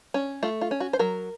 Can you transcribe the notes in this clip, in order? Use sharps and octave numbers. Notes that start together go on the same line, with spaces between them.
C#4
A3 F4
F4
C#4
F#4
C5
F#3 A#4